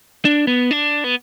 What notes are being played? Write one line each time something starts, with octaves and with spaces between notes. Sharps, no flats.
D4
B3
D4
B3